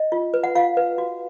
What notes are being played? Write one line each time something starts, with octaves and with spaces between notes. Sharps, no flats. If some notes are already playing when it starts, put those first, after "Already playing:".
Already playing: D#5
F4
B4
F#5
F4 F5
B4
F#4